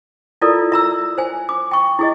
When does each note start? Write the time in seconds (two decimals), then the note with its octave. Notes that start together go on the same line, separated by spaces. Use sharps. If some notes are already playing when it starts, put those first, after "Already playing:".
0.42 E4 F4 A4 A#4 D5
0.72 E5 A#5 E6
1.18 C5 G#5
1.49 D6
1.71 G5 C#6
1.99 E4 G#4 D#5